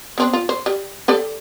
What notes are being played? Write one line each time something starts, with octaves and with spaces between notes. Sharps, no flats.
B3 C4 D4
F4
C5
G3
G4 A4 D5